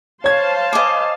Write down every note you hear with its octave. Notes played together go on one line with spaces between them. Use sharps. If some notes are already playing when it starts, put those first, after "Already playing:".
C5 C#5 F5 A5 G#6
D#5 G#5 D6